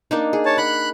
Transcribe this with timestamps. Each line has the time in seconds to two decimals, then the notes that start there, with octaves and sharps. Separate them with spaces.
0.11 A#3 D4 D#4
0.33 G#4
0.45 C#5 A5
0.58 F#5 B5 F#6